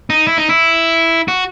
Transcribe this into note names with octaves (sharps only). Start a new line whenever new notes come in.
D#4
E4
D#4
E4
F#4